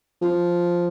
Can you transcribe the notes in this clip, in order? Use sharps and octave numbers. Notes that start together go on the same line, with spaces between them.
F3